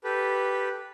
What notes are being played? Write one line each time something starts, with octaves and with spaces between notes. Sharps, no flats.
G4 A4 B4